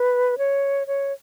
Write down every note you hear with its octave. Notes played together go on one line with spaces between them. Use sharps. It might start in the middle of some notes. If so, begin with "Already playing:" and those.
Already playing: B4
C#5
C#5